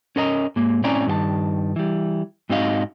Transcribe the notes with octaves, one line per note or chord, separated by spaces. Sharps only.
C#4 A#4 D#5 A#5
G#2 A#3
A2 C4 C#4 D5 G#5 A#5
G2 D#3 G4 A5
E3 G3
G#2 C4 D#4 F#4 D#5 F5